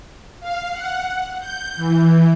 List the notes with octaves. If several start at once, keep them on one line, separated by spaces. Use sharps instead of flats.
F5
F#5
G6
E3